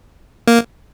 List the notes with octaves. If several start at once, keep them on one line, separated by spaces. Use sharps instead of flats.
A#3